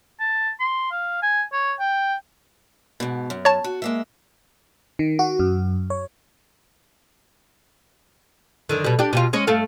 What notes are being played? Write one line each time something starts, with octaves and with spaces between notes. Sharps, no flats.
A5
C6
F5
G#5
C#5
G5
G#2 B2
F#2
C#5 A5
F#4
G#3 A#3 E5
D#3
F#4
F#2
C#5
F#2 D3 D#3
B2 G3
D4 G4
B2 G3 F4
G#3 C#4 C#5
G2 A3 F5